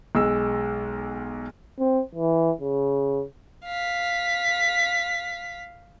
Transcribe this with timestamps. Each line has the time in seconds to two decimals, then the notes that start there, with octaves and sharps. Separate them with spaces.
0.15 B1 G#3 E6
1.79 C4
2.15 E3
2.61 C#3
3.66 F5 B6